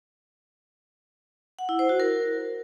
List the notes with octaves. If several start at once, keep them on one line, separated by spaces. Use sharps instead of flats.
F#5
E4
C5
F#4
A#4